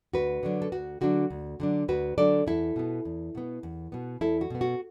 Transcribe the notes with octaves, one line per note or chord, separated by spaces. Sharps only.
D2 F#4 B4
D3 F#3 D4
A4
D2 F#4
D3 F#3 D4 F#4
D2
D3 F#3 D4
D2 F#4 B4
D3 F#3 D4 A4 D5
E2 E4 A4
B2 B3
E2
B2 B3
E2
B2 B3
E2 E4 A4
F#4
B2 B3
F#4